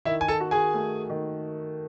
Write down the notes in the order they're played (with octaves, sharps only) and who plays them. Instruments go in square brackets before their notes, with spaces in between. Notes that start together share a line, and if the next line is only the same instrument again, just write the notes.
[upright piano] D#3 [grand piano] E4 E5
[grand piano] G#5
A4 A5
[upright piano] F#4
[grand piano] G#4 G#5
[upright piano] A3
D#3